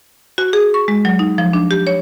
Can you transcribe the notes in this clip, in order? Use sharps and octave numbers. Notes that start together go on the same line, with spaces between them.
F#4
G#4
C#6
G#3
F#3
D#4
F3
D4
G4
C#5